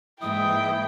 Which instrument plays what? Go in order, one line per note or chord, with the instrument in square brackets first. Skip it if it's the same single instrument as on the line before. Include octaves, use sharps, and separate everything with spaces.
[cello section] G#2 E3 G#3 [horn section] A#3 E4 [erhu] G5 [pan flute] D#6